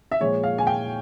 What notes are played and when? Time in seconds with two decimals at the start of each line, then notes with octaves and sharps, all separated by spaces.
0.12 E5
0.20 A#2 F3 G#3 C#5
0.43 F5
0.58 G#5
0.67 G5